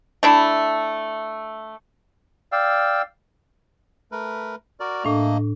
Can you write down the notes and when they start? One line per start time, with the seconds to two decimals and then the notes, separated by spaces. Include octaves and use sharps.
0.23 A3 D4 E4
2.52 D5 F5 G5 E6
4.12 A3 A#4 B4
4.80 F#4 A#4 D5
5.05 A2 A3 A#3 D4 D#5